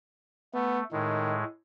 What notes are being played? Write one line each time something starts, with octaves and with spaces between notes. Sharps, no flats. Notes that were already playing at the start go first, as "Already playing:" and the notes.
A3 B3
A2 D#3 G#3